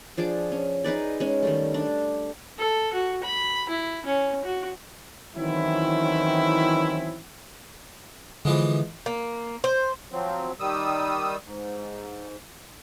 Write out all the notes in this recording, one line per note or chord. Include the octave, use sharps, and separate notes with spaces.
F3 D4 G#4 D6
C#4
D#4 G#4 B4 D5
G#3 C#4
D#3 G3 A3
D4
A4
F#4
B5
E4
C#4
F#4
D#3 E3 F#3 C4 C#4 E4
D3 E3 F3 G#3
A#3
C5
F3 F#3 C4
D#3 G3 D#6 E6
G#2